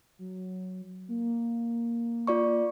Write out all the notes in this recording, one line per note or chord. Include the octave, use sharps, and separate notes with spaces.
F#3
A#3
F4 D5 C#6